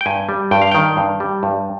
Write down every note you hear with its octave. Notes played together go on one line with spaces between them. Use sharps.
G5
G2 G#5
G3
G2 G5
F5
D#3 G5
G2
G3
G2